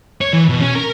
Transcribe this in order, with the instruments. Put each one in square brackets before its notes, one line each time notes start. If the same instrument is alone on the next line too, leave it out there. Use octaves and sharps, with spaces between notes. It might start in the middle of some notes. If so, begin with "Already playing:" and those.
[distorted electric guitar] C#5
E3
B2
C#4
A#4